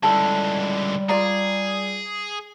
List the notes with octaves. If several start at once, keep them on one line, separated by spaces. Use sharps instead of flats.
C#2 D3 G3 E4 A4 A5
F4 G#4 D5 A#5